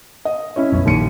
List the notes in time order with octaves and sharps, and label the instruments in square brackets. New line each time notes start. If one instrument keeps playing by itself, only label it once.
[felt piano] D#5
C#4 E4 C#5
[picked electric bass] B1 F#2 B2
[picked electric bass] A#1 [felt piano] D#2 C#7 D#7